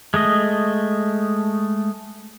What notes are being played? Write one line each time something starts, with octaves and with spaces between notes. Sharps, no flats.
G#3 A3 D#5